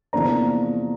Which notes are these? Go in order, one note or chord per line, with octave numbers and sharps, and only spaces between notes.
E2 C3 F3 A#3 D4 A#5